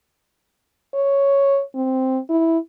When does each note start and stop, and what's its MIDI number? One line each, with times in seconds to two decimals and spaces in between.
0.94 1.62 73
1.75 2.19 60
2.30 2.58 64